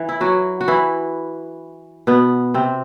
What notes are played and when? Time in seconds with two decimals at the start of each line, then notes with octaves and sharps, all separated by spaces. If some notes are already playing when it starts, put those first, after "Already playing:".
Already playing: E3
0.09 E4
0.21 F#3 F#4
0.61 F#4
0.68 E3 E4
2.07 B2 B3
2.54 C3 C4